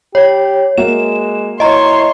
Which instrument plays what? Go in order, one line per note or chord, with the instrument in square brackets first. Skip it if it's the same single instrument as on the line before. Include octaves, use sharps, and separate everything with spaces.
[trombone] G4 [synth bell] C#5
[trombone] G#3 [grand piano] A#3 F#4 E5 [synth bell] E7
[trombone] E4 [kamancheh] C#5 C6 [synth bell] D#5 A#5